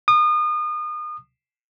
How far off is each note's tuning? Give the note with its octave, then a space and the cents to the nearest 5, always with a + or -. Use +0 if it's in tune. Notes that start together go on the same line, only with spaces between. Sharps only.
D#6 -35